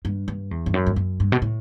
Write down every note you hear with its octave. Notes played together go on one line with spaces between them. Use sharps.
G2
G2
E2
G2
F#2
G2
F#2
G2
B2
A2